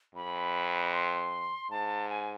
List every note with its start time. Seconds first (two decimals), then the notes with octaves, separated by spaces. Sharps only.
0.15 F2 B5
0.93 C6
1.71 G#2 A5
2.09 G#5